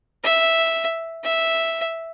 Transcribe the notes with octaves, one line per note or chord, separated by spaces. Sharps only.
E5
E5